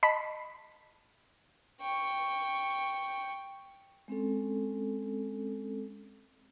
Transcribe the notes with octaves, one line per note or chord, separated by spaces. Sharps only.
D#5 A5 B5 B6
G5 C#6
G#3 C4 C#4 A4